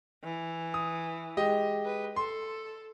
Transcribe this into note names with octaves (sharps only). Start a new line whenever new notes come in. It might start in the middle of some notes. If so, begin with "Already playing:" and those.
E3
D#6
G#3 G4 D#5
B4
A4 C6